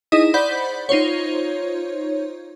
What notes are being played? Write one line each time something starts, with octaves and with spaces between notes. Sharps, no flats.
D#4 E4 G#4 D#5 D#6
C5 D5 F#5 B5 G6 B6
D#4 F4 C5 C#5